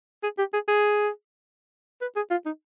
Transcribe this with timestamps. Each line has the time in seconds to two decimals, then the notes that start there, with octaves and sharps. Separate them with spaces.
0.23 G#4
0.38 G4
0.53 G#4
0.68 G#4
2.01 B4
2.16 G#4
2.31 F4
2.46 D#4